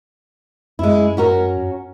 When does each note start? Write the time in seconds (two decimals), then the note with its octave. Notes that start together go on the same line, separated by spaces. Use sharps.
0.79 F#2 G#3 E4
1.17 C#4 F#4 A#4